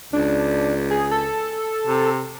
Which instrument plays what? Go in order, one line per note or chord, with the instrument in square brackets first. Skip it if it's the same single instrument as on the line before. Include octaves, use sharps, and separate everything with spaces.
[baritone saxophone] C#2 [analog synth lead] D4
[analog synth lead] G#4
A4
[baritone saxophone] C3